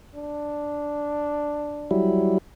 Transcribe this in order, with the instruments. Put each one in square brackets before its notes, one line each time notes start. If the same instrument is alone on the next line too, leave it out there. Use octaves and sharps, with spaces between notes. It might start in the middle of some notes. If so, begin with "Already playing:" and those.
[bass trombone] D4
[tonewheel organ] F#3 G3 E4